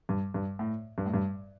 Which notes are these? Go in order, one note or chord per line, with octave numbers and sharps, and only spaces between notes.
G2
G2
A2
G2
A2
G2